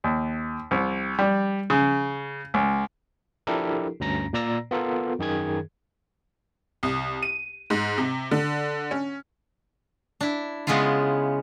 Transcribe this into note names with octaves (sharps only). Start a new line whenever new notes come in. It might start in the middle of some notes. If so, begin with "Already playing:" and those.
D#2
C2
G3
C#3
C#2
F3 D4 E4 G4 A4 A#4
D2 G2 C#4 A#5 A#6
A#2 A#3 D5 A#5 E6 A#6
B3 F4 A4 A#4
F#2 D#3 G#4 G#6
C2
D#7
G#2
C3
D3
C#4
D4 E4
C#3 G#3 B3 E4 F4